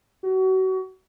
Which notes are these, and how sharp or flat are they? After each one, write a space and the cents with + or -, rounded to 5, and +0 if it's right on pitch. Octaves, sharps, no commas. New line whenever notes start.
F#4 +30